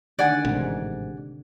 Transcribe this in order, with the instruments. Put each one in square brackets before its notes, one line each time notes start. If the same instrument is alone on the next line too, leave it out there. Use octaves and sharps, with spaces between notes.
[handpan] D3 D#3 [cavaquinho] D5 F#5 G#5
[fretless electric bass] A1 G#2 [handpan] C3